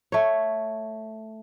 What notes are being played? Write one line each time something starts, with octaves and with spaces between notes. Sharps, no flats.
A3 C#5